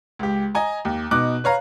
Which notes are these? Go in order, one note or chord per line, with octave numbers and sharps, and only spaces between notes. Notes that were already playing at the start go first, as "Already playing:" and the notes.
C#2 G4
D#5 G#5 A#5
D#2
B2 D#4 D6 F#6
B4 C#5 F5 A#5